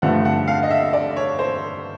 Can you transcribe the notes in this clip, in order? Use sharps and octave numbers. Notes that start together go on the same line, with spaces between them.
G2 D3 F3 A3 F#5
F#5
F5
D#5
E5
D5
C#5
C5